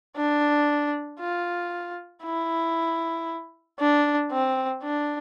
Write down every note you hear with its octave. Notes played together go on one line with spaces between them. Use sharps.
D4
F4
E4
D4
C4
D4